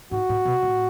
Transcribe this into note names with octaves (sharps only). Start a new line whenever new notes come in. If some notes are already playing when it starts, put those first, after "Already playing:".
G#2 F#4
A2
B2
A2